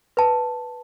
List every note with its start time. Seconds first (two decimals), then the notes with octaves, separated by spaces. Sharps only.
0.17 B4 A5